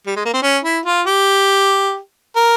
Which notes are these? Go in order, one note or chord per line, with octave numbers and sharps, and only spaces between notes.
G3
G#3
A#3
C4
C#4
E4
F4
G4
A#4